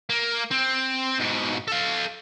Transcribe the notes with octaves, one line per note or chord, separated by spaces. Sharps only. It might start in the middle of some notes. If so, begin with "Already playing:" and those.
A#3
C4
G#2 B2
A4 F5